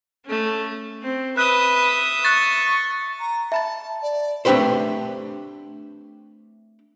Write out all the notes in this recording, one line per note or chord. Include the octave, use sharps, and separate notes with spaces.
A3 C#4
C4
B4 E5 D#6 F#6 G7
C#6 F#6 A6
A#5
E5 A5 B5 A6
D5
A3 C4 D4 G4 B4 C5